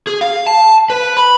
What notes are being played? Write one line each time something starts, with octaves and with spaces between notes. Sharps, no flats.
G#4
F5
A5
B4
B5